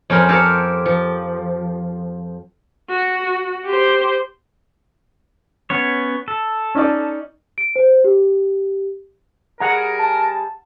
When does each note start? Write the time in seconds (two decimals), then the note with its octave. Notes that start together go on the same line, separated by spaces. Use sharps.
0.10 F2 C#4 A#4 C5 B5
0.29 G4 A4 A#4 C5 C#5 F5
0.86 F3
2.89 F#4
3.65 G4 C5
5.70 B3 C#4 C#5
6.28 A4
6.75 C#4 D#4 D5
7.58 D7
7.76 C5
8.04 G4
9.60 G3 G#4 A#4 F#5 A#5
9.99 A5